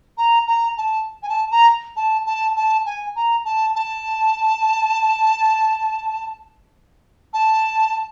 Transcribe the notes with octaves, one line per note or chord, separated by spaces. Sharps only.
A#5
A#5
A5
G#5
A5
A#5
A5
A5
A5
G#5
A#5
A5
A5
A5